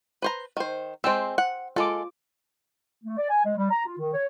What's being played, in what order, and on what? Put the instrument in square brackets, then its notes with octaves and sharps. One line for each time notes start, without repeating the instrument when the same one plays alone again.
[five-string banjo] B4 C5 A#5
D#3 C5
[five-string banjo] G#3 C4 [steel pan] C5 G5 E6
[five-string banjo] F#5
[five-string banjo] G#3 A4 [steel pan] F4 D6
[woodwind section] A3
D5
G#5
G#3
G3
A#5
F4
D#3
C#5